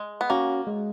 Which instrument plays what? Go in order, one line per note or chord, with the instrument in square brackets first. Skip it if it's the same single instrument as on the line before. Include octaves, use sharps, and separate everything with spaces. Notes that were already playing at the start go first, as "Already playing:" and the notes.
Already playing: [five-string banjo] G#3
B3
[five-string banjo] A#3 [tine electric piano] C#4 F#4
[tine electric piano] G#3